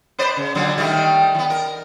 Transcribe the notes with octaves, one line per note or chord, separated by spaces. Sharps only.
B4 C5 D5
C#3
A#2 D3 F#3
D#3 G3 A3
E3 B3
A#4